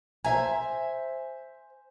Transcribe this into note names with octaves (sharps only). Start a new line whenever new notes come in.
C5 E5 G#5 A#5